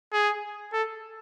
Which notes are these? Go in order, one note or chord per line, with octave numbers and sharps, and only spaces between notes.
G#4
A4